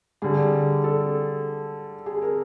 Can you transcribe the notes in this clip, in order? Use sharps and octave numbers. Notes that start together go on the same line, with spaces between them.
D3 G3 G#4
A4
G#4
A#4